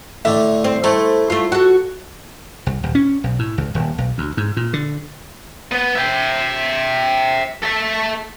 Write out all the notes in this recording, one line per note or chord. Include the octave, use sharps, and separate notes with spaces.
A2 D3 D4 E5
C4
A3 E4 C5
A3 F4
F#4 A4
C2
D#1
C#4
B1
A2
C#2
D#1
B1
D2
G#2
A#2
D3
B3
E5 G5
A4 E5